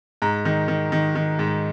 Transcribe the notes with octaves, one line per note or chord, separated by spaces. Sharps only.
G#2 A#5
D#3
D#3
D#3
D#3
G#2